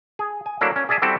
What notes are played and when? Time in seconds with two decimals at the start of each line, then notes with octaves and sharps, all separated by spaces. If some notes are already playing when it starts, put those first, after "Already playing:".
0.19 G#4
0.46 G#5
0.61 F#3 A3 A#3 D4 E4
0.76 C#4
0.89 G#4 D5 E5 G#5 A5
1.02 G3 C4 E4 F#4 A4 D5